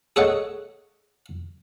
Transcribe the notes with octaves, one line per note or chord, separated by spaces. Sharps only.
G#4 A4 C#5 D#5 F#5